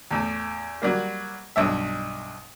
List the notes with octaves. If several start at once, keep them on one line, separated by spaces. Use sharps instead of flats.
E2 A2
F#3 G3 A#3
B1 G2 E5